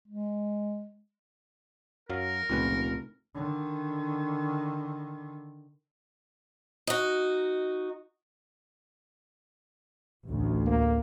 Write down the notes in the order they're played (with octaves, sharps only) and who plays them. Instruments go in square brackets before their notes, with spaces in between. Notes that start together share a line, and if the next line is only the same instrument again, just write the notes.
[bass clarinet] G#3
[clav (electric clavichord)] F#2 F#3 F5 [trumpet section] A#4
[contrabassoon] F1 [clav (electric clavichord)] C#2 A#2 B4
[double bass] D3 D#3
[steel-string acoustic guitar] D#4 F#4
[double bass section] A1 D2
[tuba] A#3